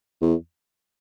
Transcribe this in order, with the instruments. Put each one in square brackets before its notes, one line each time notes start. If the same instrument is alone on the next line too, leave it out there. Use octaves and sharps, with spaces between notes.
[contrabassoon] E2